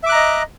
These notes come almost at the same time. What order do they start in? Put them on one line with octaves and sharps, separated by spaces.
E5 D6 F#6 A#5 D#5